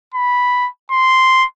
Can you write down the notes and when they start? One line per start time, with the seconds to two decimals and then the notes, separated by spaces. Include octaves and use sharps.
0.14 B5
0.91 C6